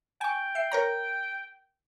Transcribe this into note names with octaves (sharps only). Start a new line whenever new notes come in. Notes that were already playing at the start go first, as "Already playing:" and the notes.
G5 G#5 C#6
E5 C7
A#4 C#5 A#5